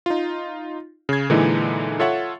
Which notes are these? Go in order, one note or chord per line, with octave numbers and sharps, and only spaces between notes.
D#4 F4
C#3 G#6
A#2 D3 E3 G#3 D#4 E4
F4 A4 C#5 E5 F#5 C#6